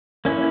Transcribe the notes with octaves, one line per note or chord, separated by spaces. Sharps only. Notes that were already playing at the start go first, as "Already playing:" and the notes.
A#3 C#4 E4 B4